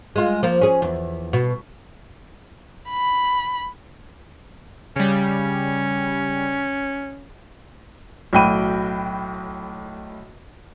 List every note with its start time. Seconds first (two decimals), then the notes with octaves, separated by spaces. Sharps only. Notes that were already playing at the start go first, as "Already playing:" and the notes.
0.16 G#3 F4
0.43 F3 A#3
0.61 C#4 G#4
0.82 E2
1.33 B2
2.90 B5
4.96 C#3 G3 C#4
8.33 B1 A2 F#4 G5 B5 D#7